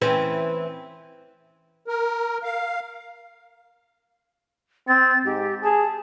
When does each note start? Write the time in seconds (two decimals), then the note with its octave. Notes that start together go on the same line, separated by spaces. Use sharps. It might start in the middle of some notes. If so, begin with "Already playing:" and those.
0.02 E3 C4 C#4
1.88 A#4
2.44 F5
4.88 C4 A6
5.25 G#2 G4
5.63 G#4 A5